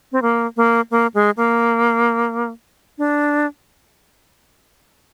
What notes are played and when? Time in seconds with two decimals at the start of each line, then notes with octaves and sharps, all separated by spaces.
0.12 C4
0.22 A#3
0.57 A#3
0.91 A#3
1.14 G#3
1.37 A#3
2.98 D4